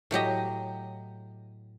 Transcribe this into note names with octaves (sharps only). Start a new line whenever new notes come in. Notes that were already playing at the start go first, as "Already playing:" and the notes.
A2 F#3 G4 D#5